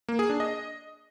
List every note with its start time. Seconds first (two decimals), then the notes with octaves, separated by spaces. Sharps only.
0.08 A#3
0.19 G#4
0.30 D4
0.40 D#5